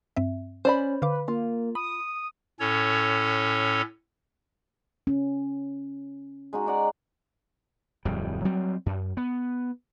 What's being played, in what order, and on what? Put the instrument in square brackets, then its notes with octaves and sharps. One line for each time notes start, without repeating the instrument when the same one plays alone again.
[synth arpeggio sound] G2 C4 E5
[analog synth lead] C#4 [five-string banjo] C5 D5 B5
[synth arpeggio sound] D3 F5 D6 [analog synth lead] B4
[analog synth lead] A#3 [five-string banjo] F4
[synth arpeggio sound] B5 [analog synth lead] D#6
[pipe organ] A2 C#4 A4 C#5
[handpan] C#4
[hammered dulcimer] G#3 D#4 F#4
D#4 D5 F#5
[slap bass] D1 F2 G3
F#3 G3 C4
F#2
B3